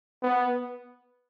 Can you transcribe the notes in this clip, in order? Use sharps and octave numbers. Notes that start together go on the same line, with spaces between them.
B3